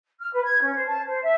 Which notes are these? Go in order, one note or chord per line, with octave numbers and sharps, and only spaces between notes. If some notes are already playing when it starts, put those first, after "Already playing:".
F6
B4
G#6
C#4
C5
A5
C5
E5